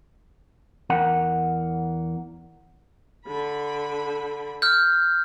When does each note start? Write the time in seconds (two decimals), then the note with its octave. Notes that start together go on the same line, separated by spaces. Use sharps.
0.90 E2 A#4 F#5
3.26 D3 B5
4.62 F6 G6